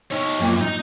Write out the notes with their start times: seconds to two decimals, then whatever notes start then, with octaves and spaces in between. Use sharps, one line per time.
0.11 D#4 C#5
0.40 F#2 F3 A#3 F4
0.60 D#4 D#5